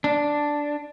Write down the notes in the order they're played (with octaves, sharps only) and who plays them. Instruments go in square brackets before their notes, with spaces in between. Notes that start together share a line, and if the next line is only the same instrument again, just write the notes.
[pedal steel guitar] D4